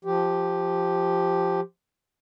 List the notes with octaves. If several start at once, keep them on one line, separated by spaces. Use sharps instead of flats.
F3 G4